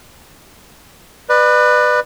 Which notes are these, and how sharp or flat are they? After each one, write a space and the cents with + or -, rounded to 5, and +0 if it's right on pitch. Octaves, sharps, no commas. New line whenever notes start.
B4 +0 D5 +35